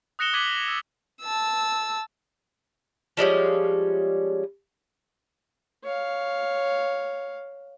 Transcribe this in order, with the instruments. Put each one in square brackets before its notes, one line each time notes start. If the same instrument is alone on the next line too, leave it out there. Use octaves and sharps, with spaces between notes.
[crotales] D#6 F#6 A#6 C#7 E7 G7
D6 G#6 B6 C#7 D#7 F#7
F7
E6 A6
[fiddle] A5 E6
[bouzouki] F3 G3 G#3 C#4
[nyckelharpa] C#5 F5